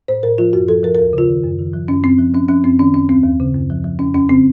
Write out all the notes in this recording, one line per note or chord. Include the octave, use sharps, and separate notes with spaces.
A2 C5
A2 A#4
F3 F4
F#2 F#4
F3 A4
F3 A#4
A#4
D#2
C#3 F4
D#3
F#2
D#3
F3
F#2 C#4
F#2 C4
F3
F3 C#4
F3 C#4
F#2 C4
D#3 C#4
F#2 C#4
D#2 C4
D#2
C#3
F#2
F3
F3
F2 C#4
F2 C#4
C#3 C4